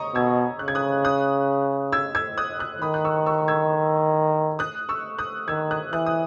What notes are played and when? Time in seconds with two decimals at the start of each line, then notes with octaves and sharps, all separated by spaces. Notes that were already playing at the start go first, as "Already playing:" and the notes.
Already playing: C#5 D#5 A#5 C#6 D#6
0.15 B2 E6 G#6
0.59 C#3 F#6
0.68 G#6
0.75 D#6 F#6
1.05 D#6 F#6
1.92 E6 G#6
2.15 E6 G#6
2.38 D#6 F#6
2.59 D#6 F#6
2.82 D#3 B5 D#6
2.94 F#6
3.05 C#6 E6
3.26 C#6 E6
3.48 E6 G#6
4.59 D#6 F#6
4.89 C#6 E6
5.19 D#6 F#6
5.48 D#3 E6 G#6
5.71 D#6 F#6
5.93 E3 D#6 F#6
6.06 D#6